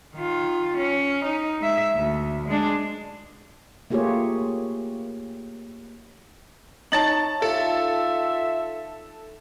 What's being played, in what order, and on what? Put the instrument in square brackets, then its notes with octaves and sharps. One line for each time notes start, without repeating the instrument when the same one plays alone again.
[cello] D#3 F4
C#4
D#4
G#3 E5
D2
G#3 D4
[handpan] A3 A#3 F4 G4 G#4 C#5
[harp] D#4 C#5 [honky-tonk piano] A5 A6 F#7
[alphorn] F4 [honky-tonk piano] A4 [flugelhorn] E5